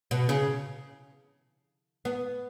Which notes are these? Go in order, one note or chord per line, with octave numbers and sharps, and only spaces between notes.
B2
C#3
B3